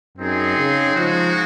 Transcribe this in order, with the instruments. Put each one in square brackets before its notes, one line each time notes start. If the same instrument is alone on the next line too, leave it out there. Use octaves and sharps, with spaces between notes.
[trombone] F#2 [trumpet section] C4 D#4 G#4
[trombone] C#3
[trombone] F3 [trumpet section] G#3 D#4 F#4